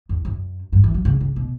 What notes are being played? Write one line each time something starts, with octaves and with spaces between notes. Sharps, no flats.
E2
F#2
G2
E3
F#3
C#3
C#3
B2